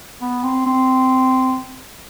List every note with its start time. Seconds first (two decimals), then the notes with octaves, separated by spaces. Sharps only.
0.22 B3
0.44 C4
0.66 C4